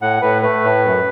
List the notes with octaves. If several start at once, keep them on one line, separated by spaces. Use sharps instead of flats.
A2 F#5
A2 B4
A3 B4
A2
F#2